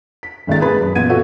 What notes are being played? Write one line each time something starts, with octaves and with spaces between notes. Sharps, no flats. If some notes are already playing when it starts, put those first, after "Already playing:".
B6
G#1 C#2 D#3 A3 D#4 A6
G#4 B4 B5
F#2
A1 A#2 B3 F#5 G#6 D#7
B3 F#4 A4 C#5